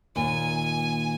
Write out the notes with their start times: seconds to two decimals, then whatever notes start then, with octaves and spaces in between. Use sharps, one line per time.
0.16 D#2 A#2 G#5